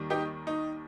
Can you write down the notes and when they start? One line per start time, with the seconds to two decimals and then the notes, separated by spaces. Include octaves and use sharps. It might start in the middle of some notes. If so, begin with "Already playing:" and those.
Already playing: D#2 D#3 G3
0.10 D#4 G4
0.47 D#4